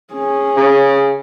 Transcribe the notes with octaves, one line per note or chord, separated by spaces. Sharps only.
C#4 G#4
C#3